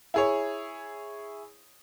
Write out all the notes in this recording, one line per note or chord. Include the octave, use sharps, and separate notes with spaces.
E4 G#4 C#5